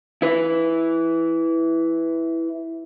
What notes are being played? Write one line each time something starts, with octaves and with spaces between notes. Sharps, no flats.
E4 B4